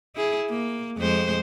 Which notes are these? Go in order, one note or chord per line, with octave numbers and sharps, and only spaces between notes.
E4 G#4
A#3
F2 G#3 C5